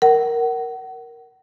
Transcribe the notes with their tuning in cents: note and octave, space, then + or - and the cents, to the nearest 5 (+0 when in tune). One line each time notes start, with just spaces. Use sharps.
A#4 +0 F#5 +30